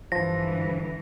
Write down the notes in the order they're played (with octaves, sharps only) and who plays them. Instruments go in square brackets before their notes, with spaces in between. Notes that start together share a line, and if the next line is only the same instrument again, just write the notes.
[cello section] G2 D3 E3 [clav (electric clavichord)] F3 [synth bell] A#6